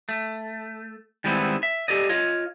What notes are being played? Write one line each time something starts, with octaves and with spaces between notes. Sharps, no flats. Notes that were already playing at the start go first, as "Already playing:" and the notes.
A3
D#3 G3 G#3 B3 C4 E4
E5
G4 A4 D5 D#5
F4 C#5 D#5